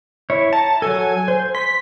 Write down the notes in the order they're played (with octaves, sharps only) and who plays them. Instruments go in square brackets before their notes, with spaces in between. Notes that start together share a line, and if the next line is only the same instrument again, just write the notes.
[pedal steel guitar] E4 C#5
[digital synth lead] A5 [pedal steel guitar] A#5
[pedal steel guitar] F#3 A4 [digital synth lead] G#5
[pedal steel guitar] C5
[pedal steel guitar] C6 [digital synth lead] B6